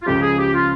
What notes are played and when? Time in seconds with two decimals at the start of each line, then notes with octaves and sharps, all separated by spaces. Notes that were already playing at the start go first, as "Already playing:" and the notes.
0.02 F4
0.06 C#2 C#3 F3 G4
0.21 G#4
0.38 G4
0.54 F4